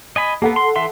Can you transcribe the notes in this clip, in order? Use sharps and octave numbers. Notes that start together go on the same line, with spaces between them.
D#5 G#5 B5
A#3 B3 A4 F#5
C6
E3 E5 C6